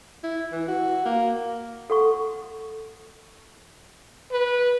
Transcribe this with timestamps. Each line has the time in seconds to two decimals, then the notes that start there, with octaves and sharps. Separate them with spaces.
0.24 E4
0.52 E3
0.68 F#4
1.05 A#3
1.90 A4 F#5 C#6
4.31 B4